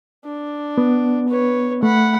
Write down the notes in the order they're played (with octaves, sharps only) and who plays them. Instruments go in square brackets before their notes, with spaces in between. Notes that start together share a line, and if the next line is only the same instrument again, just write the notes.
[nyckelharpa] D4
[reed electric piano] B3
[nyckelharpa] B4 C#5
[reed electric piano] A3 [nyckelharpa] F#5 B5